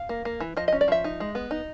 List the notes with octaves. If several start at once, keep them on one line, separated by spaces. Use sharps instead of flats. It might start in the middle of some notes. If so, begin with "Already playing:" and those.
Already playing: F5
A#3
A#3
E3
F3 D#5
D#5
C#4
D5
F3 E5
D#4
G#3
B3
D#4